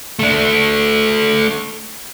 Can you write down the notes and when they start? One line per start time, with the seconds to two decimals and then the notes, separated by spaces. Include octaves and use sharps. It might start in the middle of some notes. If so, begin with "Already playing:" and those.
0.19 A3 D4